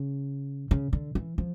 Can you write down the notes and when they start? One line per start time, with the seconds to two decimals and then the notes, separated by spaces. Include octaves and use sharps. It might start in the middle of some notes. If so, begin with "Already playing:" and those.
Already playing: C#3
0.71 C#3
0.93 D3
1.15 E3
1.38 F3